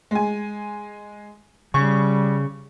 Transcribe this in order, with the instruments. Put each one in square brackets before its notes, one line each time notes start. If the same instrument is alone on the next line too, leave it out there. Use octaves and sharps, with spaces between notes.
[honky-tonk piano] G#3 G#5
[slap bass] C#3 [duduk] G3 [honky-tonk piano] C#6